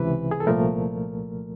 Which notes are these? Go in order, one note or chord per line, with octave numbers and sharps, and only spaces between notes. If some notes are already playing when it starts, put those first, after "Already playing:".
Already playing: C#2 C3 E3 B4
G#4
A4
C2 A#2 F3 A3 A#4